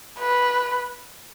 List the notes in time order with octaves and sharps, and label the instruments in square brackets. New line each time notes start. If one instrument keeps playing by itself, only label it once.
[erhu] B4